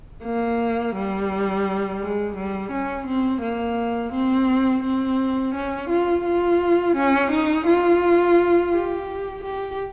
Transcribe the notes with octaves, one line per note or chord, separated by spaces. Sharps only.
A#3
G3
G#3
G3
C#4
C4
A#3
C4
C4
C#4
F4
F4
C#4
D#4
F4
G4
G4